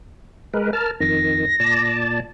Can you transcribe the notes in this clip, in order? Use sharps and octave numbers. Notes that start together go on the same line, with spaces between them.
G#3 A#4 B4
A#4 A5 F6
F2 D#3 A#6
A#2 D5 A5